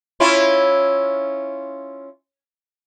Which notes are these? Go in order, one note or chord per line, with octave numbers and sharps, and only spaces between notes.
C#4 E4 F4